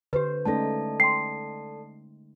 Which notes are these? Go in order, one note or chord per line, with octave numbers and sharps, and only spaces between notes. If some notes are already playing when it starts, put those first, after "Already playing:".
D3 G4 B4 C5
G#3 A3 C#4 D#4 A4 D5 A5
G5 C6 C7